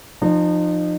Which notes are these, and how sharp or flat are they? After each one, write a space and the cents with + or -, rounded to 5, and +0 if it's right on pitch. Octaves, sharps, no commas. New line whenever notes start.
F3 +0 D#4 -35